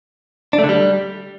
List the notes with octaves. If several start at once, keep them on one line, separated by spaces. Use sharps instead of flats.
D4
A3
D3
G3